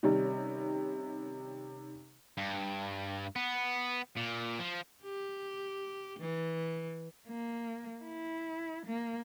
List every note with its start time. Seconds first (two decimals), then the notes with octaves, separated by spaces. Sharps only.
0.03 C3 D#3 G3 C#4 D#4
2.38 G2
3.36 B3
4.17 A#2
4.59 F3
5.03 G4
6.19 E3
7.28 A#3
8.04 E4
8.86 A#3